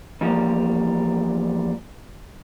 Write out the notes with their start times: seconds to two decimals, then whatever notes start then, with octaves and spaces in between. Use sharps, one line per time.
0.21 E2 F3 G3 A#3